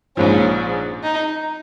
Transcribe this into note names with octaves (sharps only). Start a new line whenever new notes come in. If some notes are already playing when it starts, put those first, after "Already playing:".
A#1 G#2 F3 C#4
D#4